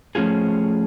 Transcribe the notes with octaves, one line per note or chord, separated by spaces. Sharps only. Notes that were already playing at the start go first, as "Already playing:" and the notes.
F3 A3 C#4 F4 G#4